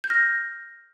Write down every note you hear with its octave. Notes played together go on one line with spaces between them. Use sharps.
G6
F6 A#6